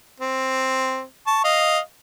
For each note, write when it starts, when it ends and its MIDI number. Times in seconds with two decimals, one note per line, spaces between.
0.20 1.02 60
1.27 1.44 81
1.27 1.44 85
1.44 1.79 75
1.44 1.79 77